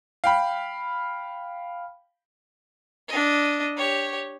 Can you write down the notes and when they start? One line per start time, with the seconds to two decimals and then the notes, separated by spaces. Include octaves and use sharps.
0.24 F5 G5 B5
3.08 D4 D#5
3.77 G4 C#5